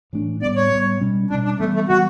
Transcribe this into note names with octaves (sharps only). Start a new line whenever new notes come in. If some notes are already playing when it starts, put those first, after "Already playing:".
A2 E3 A3 D4
A2 G3 B3 D5
C#5
A2 G3 B3
B2 G3 C#4
B2 G3 C#4 D4
D4
E3 G3 A3 B3
A3
E3 G3 B3 F#4